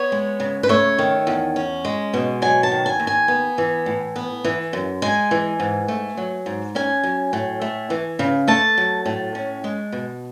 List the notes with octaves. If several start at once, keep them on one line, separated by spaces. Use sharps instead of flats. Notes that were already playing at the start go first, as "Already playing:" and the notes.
Already playing: B3 C#5
G#3
C#3
B4
A3 C#5
D#3
E2
C#4
G#3
B2
F#3 G#5
A5
D#3
G#5
D#2
G#5
B3
E3
A2
B3
E3
F#2
G#3 G#5
E3
G#2
A3
F#3
G#2
C#4 G#5
F#3
A2
A3
E3
C#3
A3 A5
F#3
A2
C#4
G#3
B2